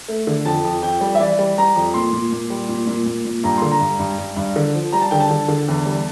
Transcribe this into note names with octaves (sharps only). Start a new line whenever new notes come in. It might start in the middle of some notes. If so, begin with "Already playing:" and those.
A3
D3
F2 A5
F2
F2 G5
G3
E5
E3 D5
G3
G3 A#5
F2
A#2 C6
A#2
A#2
G3
A#2
A#2
A#2
A#2
G2 A#5
D3 C6
A#5
G2
G2
G2
G2
D3
F3
G3 A#5
A5
D3 G5
A5
D3
D3
E2
G3